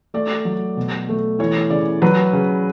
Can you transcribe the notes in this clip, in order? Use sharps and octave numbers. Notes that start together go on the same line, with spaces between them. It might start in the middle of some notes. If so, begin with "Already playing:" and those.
A3 D5
F#3
B2
A3
E3 C#5
C#3 D5
F#3 B4
C#3